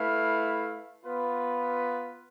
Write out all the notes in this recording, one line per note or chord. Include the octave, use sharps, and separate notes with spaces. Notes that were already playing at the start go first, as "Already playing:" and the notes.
Already playing: A3 E4 B4 F5
B3 F4 B4